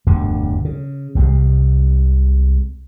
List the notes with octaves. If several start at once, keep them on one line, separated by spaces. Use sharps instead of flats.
E1 D2 G2 D3
C#3
C2 C3 F3 G#3